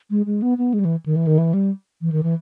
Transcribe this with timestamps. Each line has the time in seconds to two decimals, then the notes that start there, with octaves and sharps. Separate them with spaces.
0.10 G#3
0.26 G#3
0.42 B3
0.58 B3
0.74 G#3
0.79 G3
0.85 E3
1.06 D#3
1.16 E3
1.27 D#3
1.38 E3
1.54 G3
2.01 E3
2.12 D#3
2.23 E3